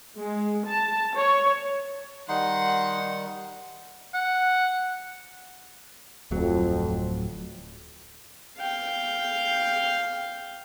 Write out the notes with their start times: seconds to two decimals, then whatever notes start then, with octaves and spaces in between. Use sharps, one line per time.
0.17 G#3
0.67 A5
1.16 C#5
2.29 D#3 G3 D#4 F#5 C6
4.14 F#5
6.31 D1 F2 A2 F#3
8.58 F5 G5